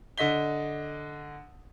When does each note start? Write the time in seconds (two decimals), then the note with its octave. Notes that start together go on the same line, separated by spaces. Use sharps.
0.18 D3 D#5 B6 G7